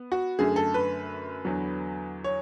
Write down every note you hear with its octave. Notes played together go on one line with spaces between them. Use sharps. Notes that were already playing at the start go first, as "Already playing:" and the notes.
Already playing: B3
F#4
F#2 D3 A3 G#4
A4
B4
E2 D3 F#3
C#5